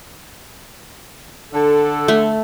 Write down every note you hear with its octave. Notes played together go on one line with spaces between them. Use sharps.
D3 A4
A3